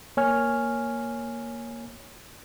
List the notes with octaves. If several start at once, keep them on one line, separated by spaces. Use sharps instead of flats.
A#3 C#5 G#5 F6